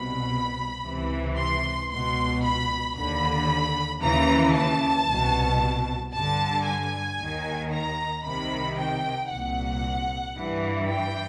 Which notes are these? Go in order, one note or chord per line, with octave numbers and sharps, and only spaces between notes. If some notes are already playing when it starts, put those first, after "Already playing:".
Already playing: C2 B2 B5
C#2 C3 E3
C6
C#2 B2 C6
B5
D#2 D3 B5
D#2 C#3 E3 A#5
A5
C2 B2
G2 D3 A5
G#5
D#2 D#3
A#5
C2 C3 D#3 B5
G5
C2 A#2 F#5
G2 E3
G5